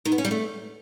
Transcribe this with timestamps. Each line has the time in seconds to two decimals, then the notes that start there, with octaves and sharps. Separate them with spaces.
0.05 D#3
0.12 B3
0.18 C#4
0.25 G3
0.31 A3